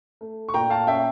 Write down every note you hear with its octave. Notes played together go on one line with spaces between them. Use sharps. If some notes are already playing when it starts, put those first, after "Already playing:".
A3
C#6
A#2 G5 A#5
F5 A5
C#4 E5 G5